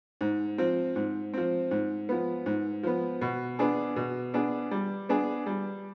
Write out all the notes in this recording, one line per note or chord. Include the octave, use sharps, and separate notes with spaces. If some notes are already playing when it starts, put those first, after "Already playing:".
G#2
F3 C4
G#2
F3 C4
G#2
F3 B3
G#2
F3 B3
B2
B3 D4 G#4
B2
B3 D4 G#4
G3
B3 D4 G#4
G3